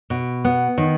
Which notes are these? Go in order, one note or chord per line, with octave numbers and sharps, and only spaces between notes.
B2
B3
D#3